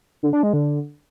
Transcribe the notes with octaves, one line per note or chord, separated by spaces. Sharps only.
D3
D4
G#3
D3